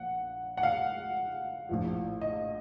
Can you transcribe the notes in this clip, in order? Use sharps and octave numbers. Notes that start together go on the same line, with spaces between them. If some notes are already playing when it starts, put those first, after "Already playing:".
Already playing: A#1 A#2 F3 F#5
F#5
F5
A#1 A2 F3
D#5